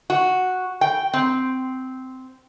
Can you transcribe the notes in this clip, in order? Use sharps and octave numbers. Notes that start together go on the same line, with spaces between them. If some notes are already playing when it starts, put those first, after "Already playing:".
F#4
G5
C4